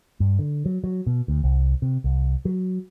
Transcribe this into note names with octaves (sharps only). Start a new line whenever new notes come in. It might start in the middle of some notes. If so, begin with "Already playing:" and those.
G2
D3
F#3
F#3
B2
D2
C2
C3
C2
F#3